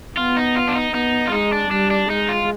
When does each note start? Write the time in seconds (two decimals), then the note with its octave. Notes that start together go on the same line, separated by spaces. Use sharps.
0.17 B3 F4
0.37 D#4
0.56 F4
0.68 D4
0.75 D#4
0.94 B3 D#4
1.27 F4
1.32 G#3 D#4
1.52 D4
1.71 G3 D4
1.91 D4
2.10 G#3 D#4
2.29 F4